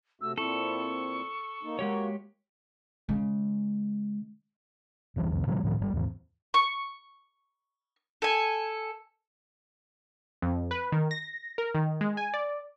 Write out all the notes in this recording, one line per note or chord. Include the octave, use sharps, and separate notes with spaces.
C3 A3 F#4 E6
A#2 C4 E4 A4 C#6
A#3 D#4
G#3 A#3 F#4 G4 C#5
C#3 G#3
F1 C#2 E3 G3
C2 F2
A#2 D3 F3 G3
C#2 A2 D#3 F3
G1 B2 G3
D#2 G#2 E3
C#6
A4 G#5
F2
B4
D#3
A#6
A#4
D#3
G#3
G#5
D5